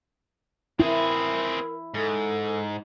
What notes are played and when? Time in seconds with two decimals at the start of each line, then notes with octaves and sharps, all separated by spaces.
0.80 C4 E4 G#4 A#4
1.94 G#2 A4